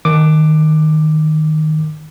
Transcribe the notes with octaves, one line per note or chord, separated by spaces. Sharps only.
D#3 D6